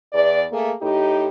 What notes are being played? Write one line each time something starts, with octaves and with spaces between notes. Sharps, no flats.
E2 D5
A3 A#3 G#4
A2 D#4 G4